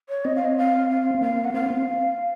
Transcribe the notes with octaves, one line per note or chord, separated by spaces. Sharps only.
C#5
C4 D#5
F5
D#5
F5
F5
C4
A#3 F5
F#5
C4 F5
C4